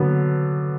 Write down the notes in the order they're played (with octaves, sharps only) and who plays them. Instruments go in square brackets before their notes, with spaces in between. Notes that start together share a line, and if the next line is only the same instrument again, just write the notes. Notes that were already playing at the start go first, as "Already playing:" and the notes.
Already playing: [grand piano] D3 F#3 B3